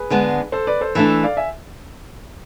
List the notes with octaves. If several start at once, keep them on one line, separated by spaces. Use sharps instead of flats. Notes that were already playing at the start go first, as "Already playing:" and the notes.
Already playing: G#4 B4
D3 G#3 B3 D4
A4 C5
B4 D5
A4 C5
E3 A3 D4 A4
A4
D5 F5
E5 G#5